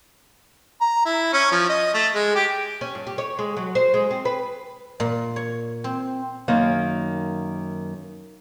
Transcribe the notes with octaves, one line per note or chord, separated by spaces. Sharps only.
A#5
E4
C#4
F3
D#5
A3
G#3
G4
C#4
G2
G4
C#5
G#3
F#3
C5
G#3
C4
B4
A#2
C#5
C4
F#2 D#3 A#3